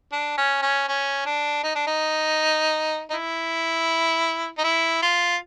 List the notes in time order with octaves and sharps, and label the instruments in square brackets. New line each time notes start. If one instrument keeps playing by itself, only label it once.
[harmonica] D4
C#4
C#4
C#4
D4
D#4
D4
D#4
D#4
E4
D#4
E4
F4